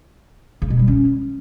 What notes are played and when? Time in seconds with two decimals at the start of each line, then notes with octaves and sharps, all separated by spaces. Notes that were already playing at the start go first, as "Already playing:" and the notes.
0.62 C#3
0.70 B2
0.79 G3
0.88 C#4